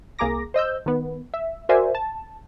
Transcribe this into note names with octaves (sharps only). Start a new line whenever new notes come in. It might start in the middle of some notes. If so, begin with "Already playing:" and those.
C2 A#3 G#4 A#5 D6 A#6
C5 D#5 E6 G6
D#3 B3
E5
F#4 A#4 C5 D5 E5 G#5
A5